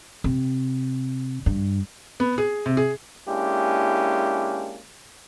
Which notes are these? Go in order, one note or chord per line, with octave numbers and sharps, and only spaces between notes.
C3
G2
B3
G#4
C3
G#4
G#3 A#3 C#4 D4 E4 G4